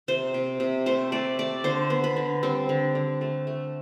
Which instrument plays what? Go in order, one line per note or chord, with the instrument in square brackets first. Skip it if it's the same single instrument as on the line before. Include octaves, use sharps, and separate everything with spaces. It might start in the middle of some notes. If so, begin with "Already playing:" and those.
[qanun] C3 C5
C3
C3
A3 C5
A3 D5
A3 D5
D3 C5
B3
B4
D3
G3 C4
D3
D3
A3
A3